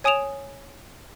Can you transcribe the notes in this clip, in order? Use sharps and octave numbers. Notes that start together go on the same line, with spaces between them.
C#5 G#5 D#6 D7 E7 F7